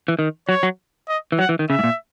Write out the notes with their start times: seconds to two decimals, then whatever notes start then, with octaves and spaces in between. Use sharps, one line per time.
0.08 E3
0.19 D#3
0.48 F#3 C#5
0.63 F#3
1.08 D#5
1.32 E3
1.39 F#3 F#5
1.49 E3
1.59 D#3
1.70 C#3 E5
1.79 G#2
1.84 A#2